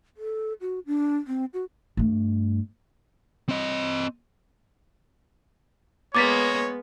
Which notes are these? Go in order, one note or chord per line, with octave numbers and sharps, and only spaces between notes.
A4
F#4
D4
C4
F#4
G2 A3
C4 D#5
G#3 A#3 B3 C#5 D6 A6 B6